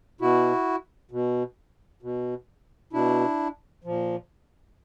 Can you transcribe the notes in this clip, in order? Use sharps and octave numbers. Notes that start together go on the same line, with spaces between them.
B2 E4 F#4
B2
B2
B2 D4 E4
A#2 F3